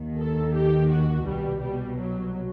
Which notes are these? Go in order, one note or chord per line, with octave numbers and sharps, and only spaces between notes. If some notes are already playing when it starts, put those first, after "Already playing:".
Already playing: D#2 D#3
A4
G4
F#4
C2 B2 G3
G3
F#3